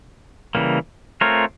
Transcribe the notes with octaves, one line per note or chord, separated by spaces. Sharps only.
C#3 E3 G3 A#3
A3 C4 F4 A#4 C#5